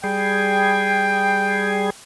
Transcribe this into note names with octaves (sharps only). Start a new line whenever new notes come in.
G3 G#4 G5